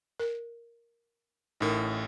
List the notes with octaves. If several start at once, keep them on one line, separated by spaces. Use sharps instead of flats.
A#4
A1 A2 D#4 A#4